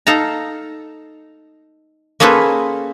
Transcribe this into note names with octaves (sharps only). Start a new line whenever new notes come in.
D#4 A4 F5 A5 A#5
A#3 C#4 G#4 A4 B4 C5